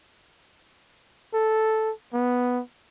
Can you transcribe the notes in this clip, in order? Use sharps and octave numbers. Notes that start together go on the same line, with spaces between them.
A4
B3